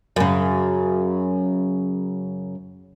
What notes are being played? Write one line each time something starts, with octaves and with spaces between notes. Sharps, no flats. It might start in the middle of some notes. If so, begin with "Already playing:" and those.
F#2 C#3